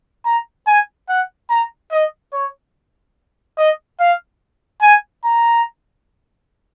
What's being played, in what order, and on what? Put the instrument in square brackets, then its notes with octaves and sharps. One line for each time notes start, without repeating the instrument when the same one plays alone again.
[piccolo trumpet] A#5
G#5
F#5
A#5
D#5
C#5
D#5
F5
G#5
A#5